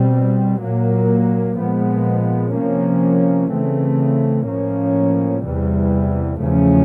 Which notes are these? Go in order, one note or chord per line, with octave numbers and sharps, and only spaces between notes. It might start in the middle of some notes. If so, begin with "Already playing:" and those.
Already playing: B2 G3 C4
A#2 F#3 A#3
A#2 F3 G#3 B3
C3 F3 A#3 C#4
C#3 E3 A3 C4
A2 F3 A#3 C#4
E2 C3 E3 G3
E2 C#3 F3 A3 C#4